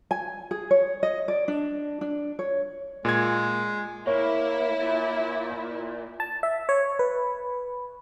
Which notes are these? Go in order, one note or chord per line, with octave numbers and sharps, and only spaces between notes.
G#5
G#4
C#5
D#5
D5
D4
D4
C#5
A#2 G#3 G#6
A#3 E4 C#5
A#2
A5
E5
C#5
B4